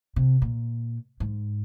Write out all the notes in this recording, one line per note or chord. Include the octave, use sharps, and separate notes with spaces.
C3
A#2
G#2